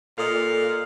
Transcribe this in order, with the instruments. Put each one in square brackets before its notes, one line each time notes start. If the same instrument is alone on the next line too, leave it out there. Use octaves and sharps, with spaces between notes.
[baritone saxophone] A#2 [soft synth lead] A4 [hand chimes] D#5 D#6 F6 [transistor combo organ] F5